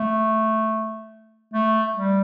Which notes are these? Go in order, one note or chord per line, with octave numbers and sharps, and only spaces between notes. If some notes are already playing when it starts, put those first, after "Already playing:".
Already playing: A3
A3
G3